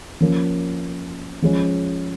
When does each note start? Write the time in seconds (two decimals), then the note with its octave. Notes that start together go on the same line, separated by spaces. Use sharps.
0.21 F3 A#3 C#4
1.42 F3 G#3 C#4